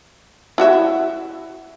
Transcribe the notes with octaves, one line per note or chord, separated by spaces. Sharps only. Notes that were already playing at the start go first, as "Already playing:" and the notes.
E4 F#4 E5